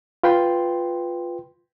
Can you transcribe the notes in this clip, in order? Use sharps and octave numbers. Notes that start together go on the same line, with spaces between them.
F4 B4 G5 C6